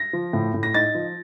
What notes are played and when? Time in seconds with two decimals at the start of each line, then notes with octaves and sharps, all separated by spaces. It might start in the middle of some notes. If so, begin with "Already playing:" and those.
Already playing: A#6
0.13 F3
0.33 A2
0.54 A2
0.63 A#6
0.74 D#4 A6
0.95 F3